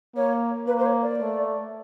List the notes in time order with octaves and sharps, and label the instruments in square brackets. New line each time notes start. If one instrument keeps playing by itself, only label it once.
[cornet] A#3 [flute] C#5
[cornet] A#3 [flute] B4
[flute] C5
C#5
D5
[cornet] A3